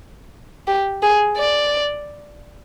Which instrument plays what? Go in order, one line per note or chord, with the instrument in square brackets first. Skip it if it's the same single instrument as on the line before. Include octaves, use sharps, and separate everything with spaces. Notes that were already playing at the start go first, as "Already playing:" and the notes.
[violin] G4
G#4
D5